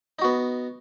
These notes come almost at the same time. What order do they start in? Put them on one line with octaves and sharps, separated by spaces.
D#4 F#4 B3